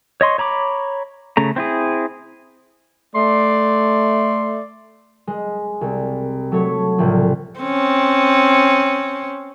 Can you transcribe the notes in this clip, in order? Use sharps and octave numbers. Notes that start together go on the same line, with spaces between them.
C#5 D#5 C6 C#6
C#5 A#5 B5 D6
C#3 A3 A#5
C4 E4 G#4
A3 D5 C6
G#3
C2
F#3 A3 A4 C#5
C2 A2 C#3 F3
C4 C#4